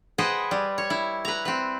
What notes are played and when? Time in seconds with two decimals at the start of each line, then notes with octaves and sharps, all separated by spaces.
0.18 G#4 B4 C5 D#5 F#5 G5
0.51 G3
0.78 C#5
0.90 E4
1.25 B4 A#5
1.45 C4 B4